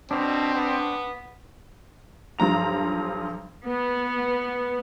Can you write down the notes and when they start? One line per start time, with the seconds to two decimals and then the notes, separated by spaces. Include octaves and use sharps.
0.11 B2 C4 D4
0.55 B3
2.39 B1 G2 F3 A#5 F7
3.67 B3